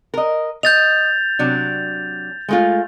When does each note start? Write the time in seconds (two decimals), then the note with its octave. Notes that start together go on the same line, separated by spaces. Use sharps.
0.14 A#4 D#5
0.63 D#5 G6 A6 F7
1.39 C3 F#3 D4
2.48 G#3 A3 F4